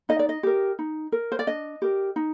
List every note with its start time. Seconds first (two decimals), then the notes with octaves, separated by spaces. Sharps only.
0.09 D#4 D#5
0.19 D5
0.29 D#5
0.43 G4 A#4
0.79 D#4
1.12 A#4
1.32 C5
1.39 D5
1.47 D4 D#5
1.82 G4 A#4
2.16 D#4